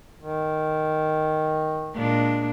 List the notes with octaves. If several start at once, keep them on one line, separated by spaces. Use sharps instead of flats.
D#3
A#2 G#3 D4